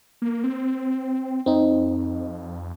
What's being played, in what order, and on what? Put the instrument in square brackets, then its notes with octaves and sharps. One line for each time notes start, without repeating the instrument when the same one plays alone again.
[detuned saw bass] A#3
C4
[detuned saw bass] F2 [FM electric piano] C4 D#4